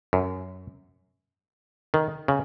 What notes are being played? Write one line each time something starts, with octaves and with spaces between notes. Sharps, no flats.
F#2
D#3
C#3